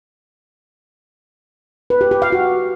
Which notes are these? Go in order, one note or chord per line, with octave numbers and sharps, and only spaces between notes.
B4
G4
G4
F5
F#4